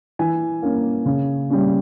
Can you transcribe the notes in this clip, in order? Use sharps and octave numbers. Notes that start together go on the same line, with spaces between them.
E3 G#5
A#3 C#4
C#3
G3 C#4